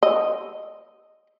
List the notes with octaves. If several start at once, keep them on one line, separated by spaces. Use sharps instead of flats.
D#5